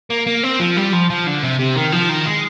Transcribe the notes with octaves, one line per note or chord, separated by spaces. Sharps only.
A#3
A#3
C4
F3
G3
F3
F3
D3
C3
C3
D#3
F3
D#3
G#3